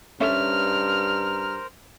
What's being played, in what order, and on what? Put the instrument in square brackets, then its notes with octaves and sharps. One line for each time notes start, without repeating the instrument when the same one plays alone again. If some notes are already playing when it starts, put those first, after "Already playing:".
[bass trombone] G2 [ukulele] C#4 A4 E5 [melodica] A#4 C5 A#5 [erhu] F6